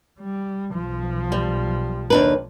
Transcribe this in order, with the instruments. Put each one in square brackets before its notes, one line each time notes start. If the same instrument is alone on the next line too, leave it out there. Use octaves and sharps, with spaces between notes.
[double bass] G3
B1 F3
[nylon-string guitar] G3
D#2 D4 B4